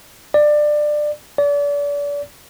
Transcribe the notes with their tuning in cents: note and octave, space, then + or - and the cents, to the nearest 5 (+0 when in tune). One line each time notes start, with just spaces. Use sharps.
D5 +20
D5 -35